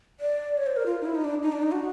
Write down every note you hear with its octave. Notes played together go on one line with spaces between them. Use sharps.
D5
C#5
C5
A#4
F4
D#4
E4
D#4
D4
D#4
D4
D#4
F#4